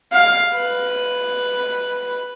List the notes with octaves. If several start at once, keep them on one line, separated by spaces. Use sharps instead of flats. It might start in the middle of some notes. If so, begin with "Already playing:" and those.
F5
B4